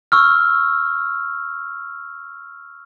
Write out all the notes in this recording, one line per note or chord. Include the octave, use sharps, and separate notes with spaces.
C#6 E6 F6